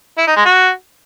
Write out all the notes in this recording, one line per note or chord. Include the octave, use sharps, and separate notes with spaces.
E4
D#4
G#3
F#4